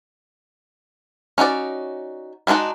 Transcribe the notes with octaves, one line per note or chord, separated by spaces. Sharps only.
C#4 D#4 F#4 D5
G3 G#3 D4 D#4 F#4